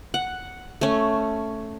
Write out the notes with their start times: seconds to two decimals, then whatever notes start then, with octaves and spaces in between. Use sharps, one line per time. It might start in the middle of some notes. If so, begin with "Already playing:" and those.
0.14 F#5
0.81 A3 C#4